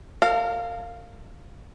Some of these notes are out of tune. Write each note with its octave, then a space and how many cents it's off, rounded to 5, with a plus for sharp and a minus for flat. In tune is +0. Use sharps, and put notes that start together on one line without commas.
A#4 -35 F5 +0 A5 +40